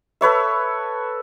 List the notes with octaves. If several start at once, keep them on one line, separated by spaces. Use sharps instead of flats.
A4 B4 C#5 E5